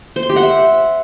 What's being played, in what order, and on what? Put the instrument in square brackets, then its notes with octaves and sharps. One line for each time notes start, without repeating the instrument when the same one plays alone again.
[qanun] C5
C6
G4
F#5
E5